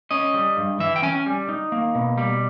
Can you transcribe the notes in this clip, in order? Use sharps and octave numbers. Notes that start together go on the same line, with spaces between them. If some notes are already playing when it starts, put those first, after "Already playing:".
C#4 D#5
G3
G2
E3 E5
G5
C#4 G#5
G3
D#4
A#3
B2
G3